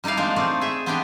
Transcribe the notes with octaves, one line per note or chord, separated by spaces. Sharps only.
G3 D#4 E4 D5 F5
F3 G#3 A#3 C4 D4 C5
A3 C4 D#4 C5 D5
G#4 E5
B3 C4 D4 G4 D#5 G5